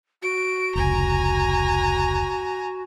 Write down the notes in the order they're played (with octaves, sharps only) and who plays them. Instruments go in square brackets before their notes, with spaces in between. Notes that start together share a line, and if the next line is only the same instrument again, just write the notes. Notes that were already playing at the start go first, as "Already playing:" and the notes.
[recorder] F#4 [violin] D7
[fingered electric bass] F1 C#2 [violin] G#5 A#5